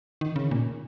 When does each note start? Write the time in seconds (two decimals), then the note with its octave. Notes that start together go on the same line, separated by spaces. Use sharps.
0.21 D#3
0.36 C#3
0.51 A#2